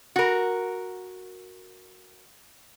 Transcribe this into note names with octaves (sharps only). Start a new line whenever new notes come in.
F#4 A#4